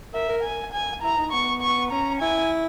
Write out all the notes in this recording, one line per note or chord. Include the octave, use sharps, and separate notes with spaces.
A#4 E5
A#4
G#5
G#5
E4 A#5
D#4
B3 C#6
C#6
C#4 A#5
E4 G#5